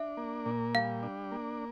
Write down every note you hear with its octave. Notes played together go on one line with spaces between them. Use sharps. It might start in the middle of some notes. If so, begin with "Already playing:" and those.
Already playing: D4 E5
A#3
A#2
G3 F5
D4
A#3